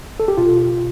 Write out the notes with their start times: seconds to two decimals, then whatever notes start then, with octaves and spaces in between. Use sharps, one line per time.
0.20 A4
0.28 G4
0.37 B2 F4